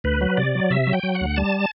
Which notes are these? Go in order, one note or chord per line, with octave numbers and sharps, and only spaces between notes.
D2 B4
F#3
C3 D5
F#3
C3 E5
F#3
G5
F#3
F#5
D2
G3 A5